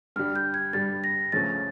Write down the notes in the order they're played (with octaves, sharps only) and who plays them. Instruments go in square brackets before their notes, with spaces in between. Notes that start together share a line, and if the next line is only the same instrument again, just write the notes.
[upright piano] G2 D3 G3 [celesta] F6
[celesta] G6
G#6
[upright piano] G2 D3 G3 [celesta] A6
[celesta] A#6
[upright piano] C#2 C#3 F3 A3 C#4 [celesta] A6